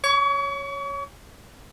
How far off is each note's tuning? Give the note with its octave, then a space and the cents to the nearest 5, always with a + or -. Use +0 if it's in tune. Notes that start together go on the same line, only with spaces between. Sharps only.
C#5 +5 C#6 +40